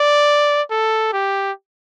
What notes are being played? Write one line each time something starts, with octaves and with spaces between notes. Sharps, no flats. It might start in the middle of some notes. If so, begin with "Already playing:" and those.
Already playing: D5
A4
G4